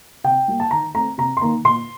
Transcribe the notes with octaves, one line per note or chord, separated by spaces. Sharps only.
C3 G5
G3 A#3
A5
D#3 A#5
A3 C4 A#5
C3 A#5
C6
D#3 A#3 A#5
A#2 C6